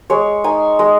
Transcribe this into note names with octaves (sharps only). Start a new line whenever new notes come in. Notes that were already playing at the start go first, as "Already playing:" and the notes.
G#3 C#5
D#4 G#5
G#3 D#5